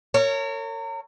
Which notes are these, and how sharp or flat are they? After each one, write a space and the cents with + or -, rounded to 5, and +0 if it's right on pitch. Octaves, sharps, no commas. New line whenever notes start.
A#4 -35 C#5 +0